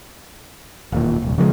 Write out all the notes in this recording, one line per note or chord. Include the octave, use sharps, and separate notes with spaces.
E1 D#2 A#2
D#1 C2
C#3 F3 G3 G#3